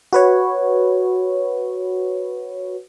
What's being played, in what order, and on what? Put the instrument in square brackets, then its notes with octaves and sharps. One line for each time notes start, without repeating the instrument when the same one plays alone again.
[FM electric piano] F#4 B4 C#5